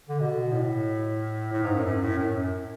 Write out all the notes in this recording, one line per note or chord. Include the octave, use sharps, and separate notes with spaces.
D3
B2
A2
A2
G#2
F#2
F#2
A2
F#2